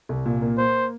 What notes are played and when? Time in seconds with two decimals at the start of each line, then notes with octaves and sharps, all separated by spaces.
0.09 C2
0.25 A#2
0.42 A#3
0.58 A#3 C5